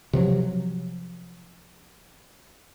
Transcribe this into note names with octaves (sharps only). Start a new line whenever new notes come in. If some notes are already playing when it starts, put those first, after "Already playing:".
C3 F3 F#3